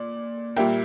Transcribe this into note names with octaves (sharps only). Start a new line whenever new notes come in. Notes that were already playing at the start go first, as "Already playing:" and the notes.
Already playing: A#2 D5
A#2 G3 A#3 E5 G5